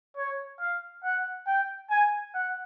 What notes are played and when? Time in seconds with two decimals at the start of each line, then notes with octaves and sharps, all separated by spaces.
0.17 C#5
0.60 F5
1.04 F#5
1.47 G5
1.90 G#5
2.34 F#5